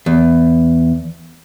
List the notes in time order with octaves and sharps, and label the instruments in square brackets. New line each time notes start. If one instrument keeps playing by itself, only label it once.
[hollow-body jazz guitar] E2